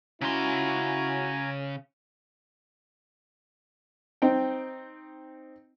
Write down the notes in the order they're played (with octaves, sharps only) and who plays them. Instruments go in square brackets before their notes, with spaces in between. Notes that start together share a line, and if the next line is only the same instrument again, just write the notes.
[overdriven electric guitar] C#3 C6 [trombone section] C#4 E4 F#4 [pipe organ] G#5 A#5
[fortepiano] C4 D#4 G5